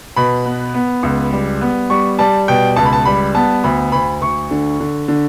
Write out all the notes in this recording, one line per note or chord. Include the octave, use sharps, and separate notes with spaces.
B2 B5
B3
B3
C#2
G3
B3
G3 C#6
G3 A5
B2 G5
C#2 A5
B5
A5
G3 B5
B3 A5
D2 B5
D2 B5
D2 C#6
D3
D3
D3